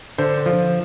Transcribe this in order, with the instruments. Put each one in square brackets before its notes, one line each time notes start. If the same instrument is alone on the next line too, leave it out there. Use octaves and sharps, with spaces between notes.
[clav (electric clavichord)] D3 [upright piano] C5
[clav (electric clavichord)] F3